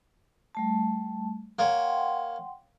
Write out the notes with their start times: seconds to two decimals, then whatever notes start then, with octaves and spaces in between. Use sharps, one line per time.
0.55 G3 A3 A5
1.59 A#3 C#5 F#5 G5 C6